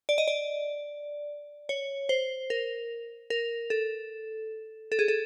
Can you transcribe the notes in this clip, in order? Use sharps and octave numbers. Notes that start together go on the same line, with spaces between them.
D5
D#5
D5
C#5
C5
A#4
A#4
A4
A4
G#4
A4